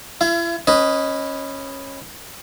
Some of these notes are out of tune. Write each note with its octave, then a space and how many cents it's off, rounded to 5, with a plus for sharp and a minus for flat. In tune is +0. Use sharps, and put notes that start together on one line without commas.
E4 +40 F5 -45
C#4 -20 B4 +0 D#5 +0